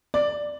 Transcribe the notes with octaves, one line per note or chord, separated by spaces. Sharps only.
D5